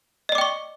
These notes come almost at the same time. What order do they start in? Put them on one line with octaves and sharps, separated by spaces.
D#5 D5 D6 G5 C#6